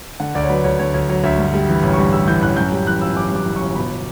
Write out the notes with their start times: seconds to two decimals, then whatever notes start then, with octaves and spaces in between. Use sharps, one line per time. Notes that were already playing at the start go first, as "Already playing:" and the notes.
0.20 D3 F#5
0.35 D2 D5
0.44 C#5
0.49 F#3 B4
0.64 D2 C#5
0.79 D3 C#5
0.94 D2 C#5
1.09 F#3 C#5
1.24 D2 E5
1.38 G2
1.54 G3
1.69 E3
1.83 A1
1.93 C#6
1.98 G2 B5
2.13 G3 E6
2.28 E3 G6
2.42 A1 F#6
2.57 F#2 G6
2.72 G3
2.87 E3 F#6
3.02 G1 E6
3.16 F#2 D6
3.31 G3 D6
3.46 E3
3.56 G1 C#6
3.75 B2 B5